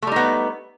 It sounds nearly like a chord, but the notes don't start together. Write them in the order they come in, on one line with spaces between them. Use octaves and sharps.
A3 G3 D#4 B3